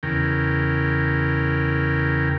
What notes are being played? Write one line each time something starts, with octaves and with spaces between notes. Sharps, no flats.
E2 C#3 A#4 G5